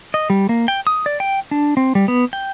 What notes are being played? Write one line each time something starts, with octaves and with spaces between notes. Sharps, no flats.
D#5
G3
A#3
G5
D#6
D5
G5
D4
C4
G3
B3
G5